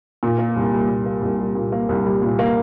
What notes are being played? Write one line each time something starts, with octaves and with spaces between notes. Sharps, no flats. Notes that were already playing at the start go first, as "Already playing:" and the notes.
A#2
A#3
C2
G3
A#2
A#3
C2
G3
A#2
A#3
C2
G3
A#2
A#3